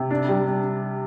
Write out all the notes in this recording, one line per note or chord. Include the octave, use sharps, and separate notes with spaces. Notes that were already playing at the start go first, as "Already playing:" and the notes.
Already playing: C3
D4
G3
D4